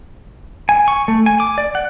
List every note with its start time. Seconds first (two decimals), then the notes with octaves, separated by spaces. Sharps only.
0.69 G#5
0.88 C#6
1.08 A3
1.26 G#5
1.40 D6
1.58 D5
1.75 F#5